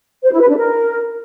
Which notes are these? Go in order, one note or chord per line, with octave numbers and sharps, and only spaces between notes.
C5
E4
B4
D4
A#4